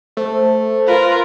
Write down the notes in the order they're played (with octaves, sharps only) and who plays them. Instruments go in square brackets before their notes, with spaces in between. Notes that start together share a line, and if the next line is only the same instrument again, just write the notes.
[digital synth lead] A3 [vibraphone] C5
[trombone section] F4 [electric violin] A#4 [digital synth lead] B4